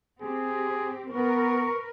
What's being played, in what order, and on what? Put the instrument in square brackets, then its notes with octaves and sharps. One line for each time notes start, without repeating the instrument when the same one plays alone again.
[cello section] C4 G4 [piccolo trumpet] G#4
[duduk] B3 [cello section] A#4 B4 [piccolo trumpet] C#6